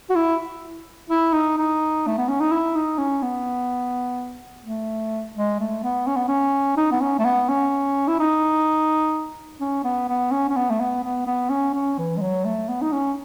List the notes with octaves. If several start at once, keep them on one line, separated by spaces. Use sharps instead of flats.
F#4
E4
E4
D#4
D#4
A3
B3
C#4
D#4
E4
D#4
C#4
B3
A3
G#3
A3
B3
C#4
B3
C#4
D#4
B3
C#4
A3
B3
C#4
E4
D#4
C#4
B3
B3
C#4
C#4
B3
A3
B3
B3
B3
C#4
C#4
E3
G#3
F#3
A3
B3
D#4
C#4